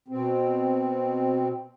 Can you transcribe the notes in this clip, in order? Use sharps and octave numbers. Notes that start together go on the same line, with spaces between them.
B2 C4